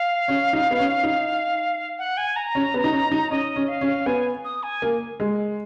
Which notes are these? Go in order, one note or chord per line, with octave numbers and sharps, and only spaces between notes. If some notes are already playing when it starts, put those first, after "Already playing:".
Already playing: F5
C#4
D#4
B3
C#4
D#4
F#5
G#5
A#5
C#4
B3
D#4
C#4
D#4
C#4 D#5
C#4
F5
C#4
B3 G#5
D#6
G#5
A#3
G#3